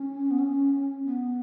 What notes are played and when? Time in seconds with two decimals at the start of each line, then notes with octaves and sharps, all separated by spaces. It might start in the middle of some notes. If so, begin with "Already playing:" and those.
Already playing: C#4
0.31 B3
0.39 C#4
1.06 B3